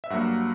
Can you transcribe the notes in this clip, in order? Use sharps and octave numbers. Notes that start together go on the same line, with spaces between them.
E5
G2 F#3 A#3 F#5